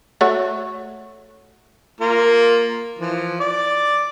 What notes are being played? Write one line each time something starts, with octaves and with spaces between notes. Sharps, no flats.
A3 F#4 C#5
A#3 F4 A#4
E3 F3
D5 D6